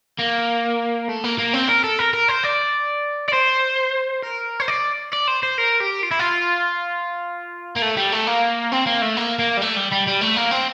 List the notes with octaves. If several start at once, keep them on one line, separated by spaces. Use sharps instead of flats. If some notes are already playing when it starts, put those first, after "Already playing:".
A#3
A3
A#3
A#3
C4
A#4
A4
A#4
A#4
C5
D5
D5
C5
A#4
C5
D5
D5
C5
C5
A#4
G4
F4
E4
F4
A#3
A3
G3
A3
A#3
C4
A#3
A3
A#3
A#3
G3
A3
G3
G3
G3
A3
A#3
C4